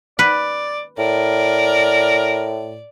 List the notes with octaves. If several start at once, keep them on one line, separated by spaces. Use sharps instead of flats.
B4 D5
A2 A#4 D5